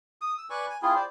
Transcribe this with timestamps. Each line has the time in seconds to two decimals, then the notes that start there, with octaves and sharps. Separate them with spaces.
0.21 D#6
0.38 E6
0.50 B4 D5 G#5 C#6
0.69 G#5
0.82 C4 E4 F4 G#4
0.96 C5 D5